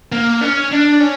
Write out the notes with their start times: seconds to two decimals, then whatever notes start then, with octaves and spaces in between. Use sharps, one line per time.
0.12 A#3
0.41 C#4
0.71 D4
1.00 C#4